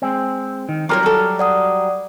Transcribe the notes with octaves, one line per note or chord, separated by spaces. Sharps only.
G#3 C4
D#3
F#3 G3 F4 A4 A#4 C#5
F#4 A4
D5 F#5 D#6